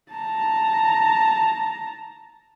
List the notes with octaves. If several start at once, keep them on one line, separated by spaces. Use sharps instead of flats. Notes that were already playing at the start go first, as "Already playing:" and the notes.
A5 A#5